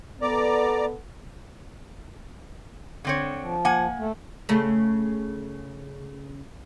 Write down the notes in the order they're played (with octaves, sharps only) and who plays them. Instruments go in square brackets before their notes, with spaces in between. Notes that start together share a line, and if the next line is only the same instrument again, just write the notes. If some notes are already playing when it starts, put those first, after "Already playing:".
[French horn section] B3 A4 [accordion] D5 A#5 D6
[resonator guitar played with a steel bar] D3 C4 C#5
[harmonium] F3
[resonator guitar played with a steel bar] A#3 F#5 G#5
[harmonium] A3
[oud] C#3 A3